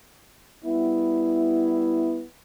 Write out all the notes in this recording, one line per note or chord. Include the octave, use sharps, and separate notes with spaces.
G3 B3 E4